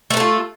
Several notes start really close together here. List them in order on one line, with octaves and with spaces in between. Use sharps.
A3 B4 A4 F4